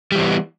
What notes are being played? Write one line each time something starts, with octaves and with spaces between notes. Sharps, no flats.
E3 G3 B3 C4